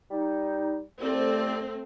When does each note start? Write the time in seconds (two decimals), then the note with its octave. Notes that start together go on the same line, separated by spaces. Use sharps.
0.11 G3 D#4
1.01 C2 A3 C4 D5